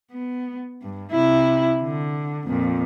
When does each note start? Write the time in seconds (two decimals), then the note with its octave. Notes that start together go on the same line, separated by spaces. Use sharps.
0.11 B3
0.83 G2
1.12 C3 E4
1.82 D3
2.47 F2 A#2